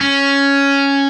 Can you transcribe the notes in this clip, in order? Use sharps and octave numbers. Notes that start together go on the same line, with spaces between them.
C#4